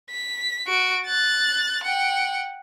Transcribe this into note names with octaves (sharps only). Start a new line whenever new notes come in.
B6
F#4 D7
F#6 A6
F#5 G5